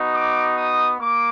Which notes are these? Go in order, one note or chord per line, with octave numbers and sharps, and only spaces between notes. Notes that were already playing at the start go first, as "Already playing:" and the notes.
Already playing: B3 D#4 F#4
D6
D#6
A#3 D6